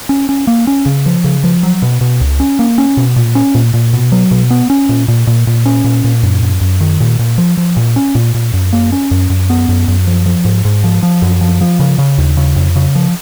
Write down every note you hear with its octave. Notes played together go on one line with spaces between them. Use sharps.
C#4
C#4
A#3
C#4
C#3
F3
C#3
F3
F#3
B2
B2
C#2
C#4
A#3
C#4
B2
A#2
C#4
A#2
A#2
B2
F#3
B2
B3
C#4
A#2
A#2
A#2
A#2
C#4
A#2
A#2
F#2
F#2
F#2
D#3
A#2
A#2
F3
F3
A#2
C#4
A#2
A#2
F#2
A#3
C#4
F#2
F#2
B3
F#2
F#2
F3
F3
G#2
G#2
F3
F3
F#2
F3
F3
C#3
C#3
D#2
C#3
F2
C#3
F3